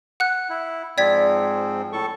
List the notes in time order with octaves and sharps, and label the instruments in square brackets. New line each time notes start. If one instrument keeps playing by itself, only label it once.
[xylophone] F#5 F#6
[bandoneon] E4
[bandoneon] G#2 F3 C4 [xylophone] D5 G#6 B6
[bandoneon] A2 A4 C#6